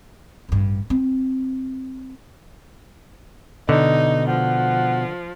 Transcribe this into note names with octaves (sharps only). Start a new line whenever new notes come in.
A1 G2
C4
B2 D3 D#4 D#5
F3 F#5